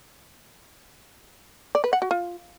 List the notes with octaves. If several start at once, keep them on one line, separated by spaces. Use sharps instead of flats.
D5
B4
F#5
F#4
F4